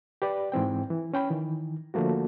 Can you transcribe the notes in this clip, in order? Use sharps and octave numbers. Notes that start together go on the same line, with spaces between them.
G4 B4 D5
G#2 E3 C4 G5
E3
C#4 G5 B5
D#3 E3
D3 F3 A3 A#3 F#4